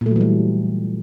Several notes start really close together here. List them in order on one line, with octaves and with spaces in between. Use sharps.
A#2 A3 F#3 E3 G3